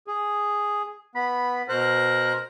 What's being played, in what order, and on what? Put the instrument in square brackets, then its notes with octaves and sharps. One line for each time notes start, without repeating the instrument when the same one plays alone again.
[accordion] G#4
[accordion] B3 [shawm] B5
[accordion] B2 C5 F#6 [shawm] A#4